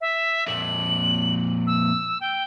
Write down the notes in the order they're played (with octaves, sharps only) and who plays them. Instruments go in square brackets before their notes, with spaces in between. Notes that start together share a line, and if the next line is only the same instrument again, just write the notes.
[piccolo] E5
[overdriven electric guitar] F2 A#2 [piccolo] F#7
[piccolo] E6
G5